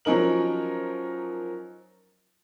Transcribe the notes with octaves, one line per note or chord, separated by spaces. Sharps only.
F3 F#3 C#4 D#4 A#4 F#7